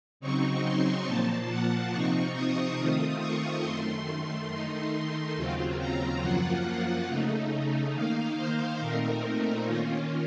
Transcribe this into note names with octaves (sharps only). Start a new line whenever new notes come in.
C#3 F#3 C4 D#4 C#6
C6
A#2 F3 A#3 A5
F#5
C3 F3 C4 D#4 C#6
D#6
D#3 A3 C4 F4 D#6
C#6
F#2 D#3 A3 C6
D#3 A3 D#4 C6
C6
D#2 C#3 F#3 C4 F4
A#5
F#2 F3 A#3 F4 F#5
F#5
C#3 A3 D#4
D#3 A#3 D#4 F5
C5
A#2 A3 C4 D#4 A#4
A#4
D#3 A#3 C#4 F4